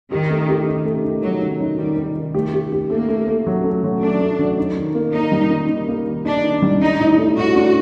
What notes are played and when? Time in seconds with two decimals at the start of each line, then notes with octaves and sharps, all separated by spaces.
0.12 D#3 G4
0.30 A3
0.49 G4
0.67 D#4
0.85 A3
1.04 D#3
1.22 D#3 F#3
1.42 D#3
1.60 D#4
1.78 D#3 G3
1.97 D#3
2.16 D#3
2.34 A3 G4
2.54 G4
2.72 G4
2.90 A3 A#3
3.09 A3
3.28 A3
3.46 F#3
3.64 A3
3.84 F#3
4.01 A3 D4
4.21 A3
4.39 F#3
4.57 D#4
4.77 D#3
4.95 A#3
5.13 A#3 D#4
5.32 G3
5.50 D#3
5.69 D#3
5.88 A#3
6.07 D#3
6.25 D4 D#4
6.44 D#3
6.62 G3
6.81 D4 D#4
7.00 A2
7.18 A3
7.37 A2 F#4
7.56 D4